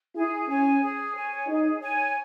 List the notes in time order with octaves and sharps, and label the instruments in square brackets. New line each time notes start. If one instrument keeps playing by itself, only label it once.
[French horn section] E4 [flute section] G#4
[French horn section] C#4 [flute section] C#5 G#5
[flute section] G#4
C#5 G#5
[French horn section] D#4 [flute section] G#4
[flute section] C#5 G#5